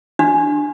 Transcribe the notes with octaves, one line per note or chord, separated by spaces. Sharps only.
D4